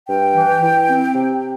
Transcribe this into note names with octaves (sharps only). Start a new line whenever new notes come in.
G2 G5
E3
E3
C4
C3